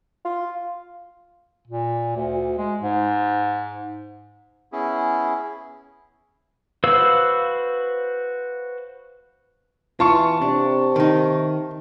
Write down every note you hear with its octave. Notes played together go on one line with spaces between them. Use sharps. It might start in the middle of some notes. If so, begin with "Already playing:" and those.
F4
A#2
D2
G#3
G#2
B3 C#4 E4 G#4
F#4 B4 C5 F5 E6
E3 F4 A5 C#6
C3 D4
D#3 D#4